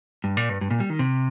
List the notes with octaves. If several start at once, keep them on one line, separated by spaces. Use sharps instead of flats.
G2
A#2
G2
G2
A#2
G3
D#3
C3